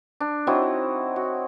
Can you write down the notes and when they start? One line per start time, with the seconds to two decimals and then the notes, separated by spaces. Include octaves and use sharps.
0.20 D4
0.47 F#3 C4 D#4 E4
1.16 F#4